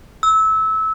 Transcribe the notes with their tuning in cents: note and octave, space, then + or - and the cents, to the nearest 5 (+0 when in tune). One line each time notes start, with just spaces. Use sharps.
E6 -20